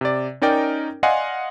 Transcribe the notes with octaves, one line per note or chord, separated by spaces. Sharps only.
C3 D5
C#4 D#4 A#4 D5 G5
D5 D#5 F5 F#5 G#5 C6